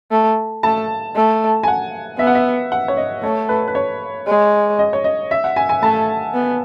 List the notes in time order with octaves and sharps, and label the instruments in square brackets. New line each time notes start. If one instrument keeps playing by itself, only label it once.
[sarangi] A3
[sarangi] A3 [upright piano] A5
[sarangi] A3
[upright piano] G#5
F#5
[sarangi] B3 [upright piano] E5
[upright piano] F#5
E5
F#5
C#5
D#5
[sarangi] A3 [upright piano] C#5
[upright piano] B4
B4
C#5
[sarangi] G#3
[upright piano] D#5
C#5
D#5
E5
F#5
G#5
G#5
[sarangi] A3 [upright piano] A5
[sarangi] B3